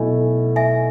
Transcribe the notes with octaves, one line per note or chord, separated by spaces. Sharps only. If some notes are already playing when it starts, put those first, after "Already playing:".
Already playing: B1 B2 A3 E4 G#5
E5 G#5